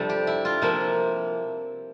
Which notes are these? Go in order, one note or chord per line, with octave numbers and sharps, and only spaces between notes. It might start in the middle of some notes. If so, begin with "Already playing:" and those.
Already playing: F2 C3 G3 A3 D4 A4
G4
E4
F4
C3 F3 A#3 E4